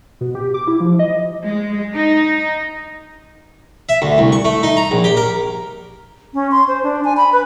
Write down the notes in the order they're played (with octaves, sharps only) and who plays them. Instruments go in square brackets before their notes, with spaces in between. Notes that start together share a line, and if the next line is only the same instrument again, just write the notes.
[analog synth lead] B2
G4
D6
E4
F3
D#5
[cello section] G#3
D#4
[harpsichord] E5
D2
C2
C#6
A3
D#4
A#5
A#1
G4
A#4
[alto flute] C#4
C6
C5
D4
G#5
B5
B4